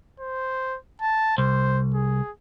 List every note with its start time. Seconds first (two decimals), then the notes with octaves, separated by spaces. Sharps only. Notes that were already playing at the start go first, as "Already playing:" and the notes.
0.20 C5
1.02 A5
1.38 C2 C5
1.95 G#4